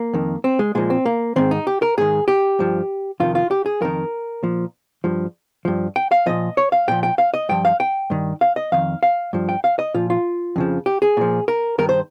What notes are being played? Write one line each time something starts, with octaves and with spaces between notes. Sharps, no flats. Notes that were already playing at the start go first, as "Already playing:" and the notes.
Already playing: A#3
F2 D#3
C4
G#3
A#2 F3 G#3
C4
A#3
G#2 D#3 C4
D#4
G4
A#4
G#2 D#3 G#4
G4
G2 F3
F2 C3 D#3 F4
F4
G4
G#4
F2 D#3 A#4
A#2 F3
G2 F3
G2 F3
G5
F5
A#2 F3 D#5
C#5
F5
A#2 F3 G5
G5
F5
D#5
G2 F3 G5
F5
G5
G2 D#3
F5
D#5
F2 D#3 F5
F5
G2 F3
G5
F5
D#5
A#2 F3 F4
F4
F2 C#3 F3
G4
G#4
A#2 F3
A#4
G2 D#3 A#4
C5